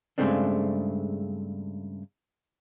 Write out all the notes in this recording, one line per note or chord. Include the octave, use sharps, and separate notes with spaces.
G2 C#3 G#3 A3 C4 D4